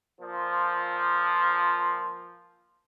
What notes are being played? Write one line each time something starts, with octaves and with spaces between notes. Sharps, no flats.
A#2 F3